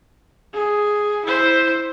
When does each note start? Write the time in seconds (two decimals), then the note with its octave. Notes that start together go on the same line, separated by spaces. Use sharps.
0.54 G#4
1.25 E4 C5